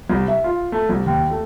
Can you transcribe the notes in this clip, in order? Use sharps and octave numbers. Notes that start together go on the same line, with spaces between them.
C2
E5
F4
A3
C2
D#2
A3